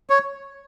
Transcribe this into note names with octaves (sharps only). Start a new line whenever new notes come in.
C#5